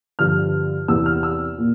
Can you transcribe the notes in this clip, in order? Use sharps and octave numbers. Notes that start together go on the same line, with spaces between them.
G2 D3 F3 F6
E2 C3 E3 E6
F6
E6
A#2